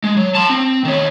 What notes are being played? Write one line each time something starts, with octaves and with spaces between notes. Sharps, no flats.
G#3
F#3
A5 C6
C4
D#3 C#5